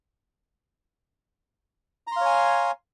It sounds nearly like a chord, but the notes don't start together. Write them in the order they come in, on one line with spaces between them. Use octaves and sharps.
A#5 C6 F5 C#5 G#5